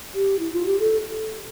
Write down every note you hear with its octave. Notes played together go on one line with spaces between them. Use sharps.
G4
E4
F4
G4
A4